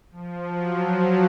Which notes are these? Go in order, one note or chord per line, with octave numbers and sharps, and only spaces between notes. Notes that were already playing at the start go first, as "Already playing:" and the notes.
F3
F#3